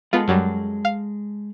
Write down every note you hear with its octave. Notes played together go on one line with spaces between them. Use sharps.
G#3 B3 F4 A4
F#2 F#3 G3
F5